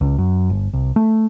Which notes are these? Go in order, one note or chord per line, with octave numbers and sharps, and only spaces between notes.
C#2
F#2
G1
C2
A3